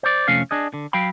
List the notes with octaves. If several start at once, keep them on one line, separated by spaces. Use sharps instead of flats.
C5 D5
F2 C3 A3 C#4 F5
D4 G#4 D#5
D3
F#3 F5 G5 B5